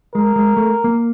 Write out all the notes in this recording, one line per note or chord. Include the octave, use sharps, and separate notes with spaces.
G#3 A#4
G#3
A3
A#3